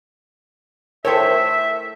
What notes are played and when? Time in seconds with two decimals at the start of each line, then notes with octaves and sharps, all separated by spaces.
1.05 A3 E4 A4 A#4 C5 C#5 E5 G5